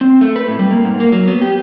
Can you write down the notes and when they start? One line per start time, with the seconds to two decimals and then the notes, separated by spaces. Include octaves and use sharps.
0.01 C4
0.21 A3
0.36 B4
0.48 A2
0.59 G3
0.71 A#3
0.85 G#2
1.00 A#3
1.12 F#3
1.28 B3
1.42 G4